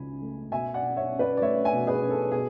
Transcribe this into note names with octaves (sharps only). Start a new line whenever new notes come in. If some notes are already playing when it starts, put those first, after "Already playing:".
Already playing: C#2 C#3 G#5 B5
A3
B2 E5 G#5
D5 F#5
B2
C#5 E5
C#4
B4 D5
D5
A3 C#5 E5
E5 G#5
B2
G#4 B4
B2
A4
B2 G#4